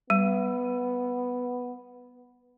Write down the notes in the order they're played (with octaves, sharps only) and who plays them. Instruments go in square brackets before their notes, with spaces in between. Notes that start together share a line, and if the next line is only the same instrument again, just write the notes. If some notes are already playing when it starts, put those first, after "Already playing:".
[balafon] G3 [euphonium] B3